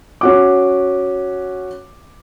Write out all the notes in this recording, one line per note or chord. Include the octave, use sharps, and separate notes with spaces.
C#4 F#4 D6